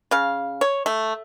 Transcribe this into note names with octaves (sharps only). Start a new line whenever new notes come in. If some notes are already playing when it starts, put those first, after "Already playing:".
C#3 F5
C#5
A3